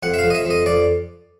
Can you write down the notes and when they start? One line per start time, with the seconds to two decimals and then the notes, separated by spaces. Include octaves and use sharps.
0.03 F2 F#5
0.14 E5
0.19 F5
0.24 F2
0.30 D#5
0.35 E5
0.45 F2
0.50 D#5
0.66 F2 D5